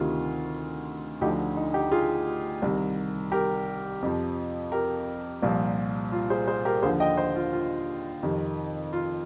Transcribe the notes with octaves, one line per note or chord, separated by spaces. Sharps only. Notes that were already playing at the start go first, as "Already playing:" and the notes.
Already playing: D2 C3 D#3 F4
D2 D3 F3 D#4 G4
D#4
D#4 G4
F4 G#4
C2 C3 D#3
G4 A#4
F2 C3 F3
G4 A#4
C2 A#2 F3
F4
G#4 C5
G#4 C5
G4 A#4
D#2 D3 F3 G#4 C5
D#5 G5
C5 D#5
F4
F4
F2 C3 D#3
F4